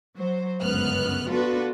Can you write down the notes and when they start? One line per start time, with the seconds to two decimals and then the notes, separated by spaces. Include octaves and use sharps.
0.17 F#3 C5
0.61 G1 C#2 F#2 B3 F6 F#6
1.30 B3 D4 F4 F#4 A4 B4